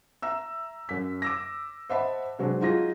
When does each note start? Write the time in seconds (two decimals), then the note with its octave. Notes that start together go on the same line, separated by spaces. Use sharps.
0.22 E5 A#5 E6
0.89 F#2 B6
1.22 D6 E6 A#6
1.90 C5 D#5 E5 F#5 A5 B5
2.39 C3 F#3 G#3 C4 D4
2.61 F#3 D#4 F4 G#4 A#6